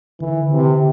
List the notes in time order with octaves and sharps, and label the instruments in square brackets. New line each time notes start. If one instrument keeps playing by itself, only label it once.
[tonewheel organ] D3 [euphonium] E3
[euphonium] C3